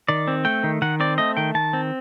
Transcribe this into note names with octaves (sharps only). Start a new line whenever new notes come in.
D#3 D5
C4
A3 G5
D#3
D#3 F#5
C4 D5
A3 D#5
D#3 G5
D#3 A5
C4